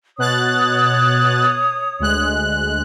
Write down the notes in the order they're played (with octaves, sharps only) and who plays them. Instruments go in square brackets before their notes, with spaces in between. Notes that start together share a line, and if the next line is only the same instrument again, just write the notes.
[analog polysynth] B2 F#6 A6 [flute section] C#5 D#6
[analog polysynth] D2 G#3 F#6